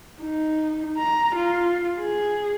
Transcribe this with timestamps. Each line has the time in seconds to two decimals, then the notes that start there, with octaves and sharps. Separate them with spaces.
0.22 D#4
0.98 A#5
1.35 F4
1.99 G#4